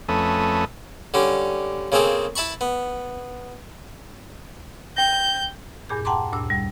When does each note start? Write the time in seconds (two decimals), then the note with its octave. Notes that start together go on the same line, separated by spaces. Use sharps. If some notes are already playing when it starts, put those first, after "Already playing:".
0.09 F2 A3 C#4 A4 B4 D#6
1.14 D3 G3 C#4
1.92 C#3 A#3 C4 G#4 A4
2.36 E4 A5 B5 C#6
2.61 B3
4.97 G5 G6 A#6
5.89 E2 G2 A#2 G#4 G6
6.05 F#5 G5 A5 A#5 C6 D6
6.33 D2 G2 A#2 E6
6.50 G3